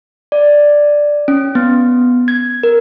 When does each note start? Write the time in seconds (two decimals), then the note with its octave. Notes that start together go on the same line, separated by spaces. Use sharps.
0.32 D5
1.28 C#4
1.55 B3
2.28 G#6
2.63 A#4